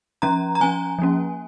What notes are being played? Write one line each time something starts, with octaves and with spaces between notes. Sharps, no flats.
F3 C#4 A#5
A#5
F3 C#4 G#5
F3 A#3 C#4